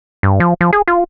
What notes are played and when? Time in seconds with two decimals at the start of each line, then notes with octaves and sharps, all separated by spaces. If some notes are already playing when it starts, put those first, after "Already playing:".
0.23 G2
0.40 F3
0.61 F3
0.73 G#4
0.88 F4